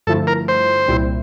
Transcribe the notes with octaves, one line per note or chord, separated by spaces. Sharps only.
G2 D3 F3 A3 E4 A4
A#4
C5
C2 A#2 G3 C4 E4